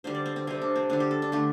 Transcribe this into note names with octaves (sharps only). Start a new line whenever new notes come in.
D3 G3 C5
D5
C4
C4
C3 G3 C4
D4
C4
D3 G3 D4
G4
A4
D4
D3 A3 G4